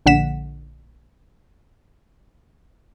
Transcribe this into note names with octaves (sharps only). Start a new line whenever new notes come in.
A#1 D3 F#5 B6 E7